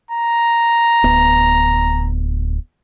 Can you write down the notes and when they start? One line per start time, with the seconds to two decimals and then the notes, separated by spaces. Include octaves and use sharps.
0.11 A#5
1.04 D1 B3